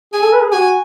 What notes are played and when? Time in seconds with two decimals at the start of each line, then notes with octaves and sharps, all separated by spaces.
0.13 G#4 G#5
0.23 A4
0.33 B4
0.43 G#4
0.53 F#4 G#5